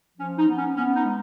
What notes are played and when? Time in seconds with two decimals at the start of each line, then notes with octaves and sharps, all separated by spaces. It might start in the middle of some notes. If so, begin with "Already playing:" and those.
0.18 F3 C#4
0.38 D#4
0.48 B3
0.58 C#4
0.76 B3 C#4
0.96 D#4
1.06 G#3